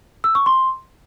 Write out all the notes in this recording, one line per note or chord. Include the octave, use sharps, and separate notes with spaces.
E6
C#6
C6